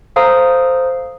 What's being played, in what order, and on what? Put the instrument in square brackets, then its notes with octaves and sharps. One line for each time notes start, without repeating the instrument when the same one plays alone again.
[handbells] A4 C5 F5 A#5 D#6